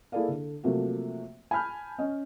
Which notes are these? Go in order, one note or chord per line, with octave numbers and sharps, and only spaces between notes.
A#3 E4 G#4 A4 D5 F5
D3
C3 F3 F#3 A3 A#3 F#4
G#5 A5 B5 F6 G6
C#4 D#5